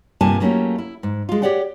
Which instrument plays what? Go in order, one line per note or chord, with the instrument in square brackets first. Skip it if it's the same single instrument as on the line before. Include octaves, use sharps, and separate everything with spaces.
[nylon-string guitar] G2 C3 A#3 F4 G#5 A5
F#3 A3 A#3 C#4 E4 G4
E4
G#2
G#3 F4
G4 G#4 C#5 D5 F#5 G5